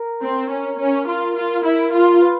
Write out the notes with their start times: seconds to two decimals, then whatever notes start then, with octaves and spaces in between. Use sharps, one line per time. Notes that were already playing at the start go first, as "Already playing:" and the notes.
Already playing: A#4
0.22 C4
0.50 C#4
0.79 C#4
1.07 F4
1.36 F4
1.64 E4
1.93 F4
2.22 B4